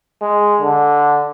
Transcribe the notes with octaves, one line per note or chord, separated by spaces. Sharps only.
G#3
D3